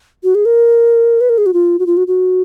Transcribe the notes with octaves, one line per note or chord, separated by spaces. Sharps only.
F#4
G#4
A#4
B4
A#4
G#4
F#4
F4
F#4
F4
F#4
F#4